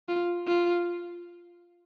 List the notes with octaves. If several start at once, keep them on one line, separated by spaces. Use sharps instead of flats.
F4
F4